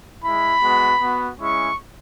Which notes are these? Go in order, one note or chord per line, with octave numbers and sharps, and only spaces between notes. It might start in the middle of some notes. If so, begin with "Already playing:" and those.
G#3 E4 B5
G#3 B3 F#4
B3 F#4
G#3 C#4 E4 C#6